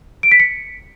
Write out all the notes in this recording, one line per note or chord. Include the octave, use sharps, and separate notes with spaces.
D7
B6
C#7